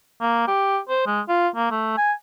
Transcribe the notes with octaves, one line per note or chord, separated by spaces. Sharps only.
A#3
G4
C5
G#3
F4
A#3
A3
G#5